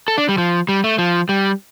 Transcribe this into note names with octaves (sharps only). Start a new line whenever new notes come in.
A4
D4
G3
F3
G3
A3
F3
G3